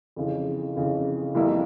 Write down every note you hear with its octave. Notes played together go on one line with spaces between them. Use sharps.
F2 C#3 E3
F2 C#3 E3
F2 E3 G3 A#3 E4